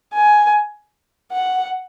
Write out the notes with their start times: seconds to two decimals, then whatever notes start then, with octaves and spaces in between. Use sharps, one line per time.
0.14 G#5
1.32 F#5